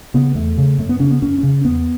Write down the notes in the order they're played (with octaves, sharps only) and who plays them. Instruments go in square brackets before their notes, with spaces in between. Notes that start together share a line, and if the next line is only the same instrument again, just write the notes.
[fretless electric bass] C#3 B3
E2 A3
C#3
F#2 A3
B3
C#3 C#4
B3
F#2 C#4
C#3 C#4
E2 B3